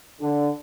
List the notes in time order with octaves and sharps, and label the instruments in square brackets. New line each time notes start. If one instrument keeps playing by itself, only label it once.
[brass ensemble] D3